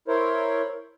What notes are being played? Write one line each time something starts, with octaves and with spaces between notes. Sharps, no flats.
E4 A#4 C5 C#5